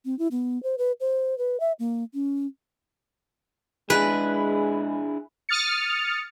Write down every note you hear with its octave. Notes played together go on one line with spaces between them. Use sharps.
C4
E4
B3
C5
B4
C5
B4
E5
A#3
C#4
G#3 D4 E4 G#4 B4
D#6 F6 A6 C#7